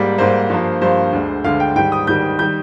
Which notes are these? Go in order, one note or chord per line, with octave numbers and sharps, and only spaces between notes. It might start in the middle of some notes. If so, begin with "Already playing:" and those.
Already playing: G#2 G3 A#3 D5
G#2 G3 A#3 C5
G2 F3 A#3
G2 F3 A#3 C5
D2 D3 G#3
D2 D3 G#3 F5
G5
G#2 D#3 G3 G5
D#6
G#2 D#3 G3 G6
D#3 G3 G6